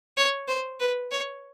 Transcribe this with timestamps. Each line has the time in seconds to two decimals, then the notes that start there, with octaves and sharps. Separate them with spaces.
0.17 C#5
0.48 C5
0.80 B4
1.12 C#5